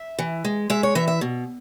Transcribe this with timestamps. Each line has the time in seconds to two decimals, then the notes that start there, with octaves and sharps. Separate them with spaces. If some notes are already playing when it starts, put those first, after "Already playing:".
Already playing: E5
0.19 E3
0.45 G#3
0.70 G#3 E5
0.83 C#5
0.95 E3 E5
1.08 E5
1.21 B2